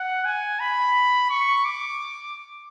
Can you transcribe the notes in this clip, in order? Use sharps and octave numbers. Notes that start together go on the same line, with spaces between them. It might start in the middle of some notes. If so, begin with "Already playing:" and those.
Already playing: F#5
G#5
B5
C#6
D6